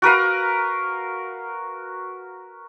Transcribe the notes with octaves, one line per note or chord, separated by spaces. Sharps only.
F#4 A#4 B4 F5